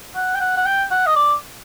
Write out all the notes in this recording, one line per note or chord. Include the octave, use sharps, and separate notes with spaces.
F#5
G5
F#5
F#5
G5
F#5
D#5
D5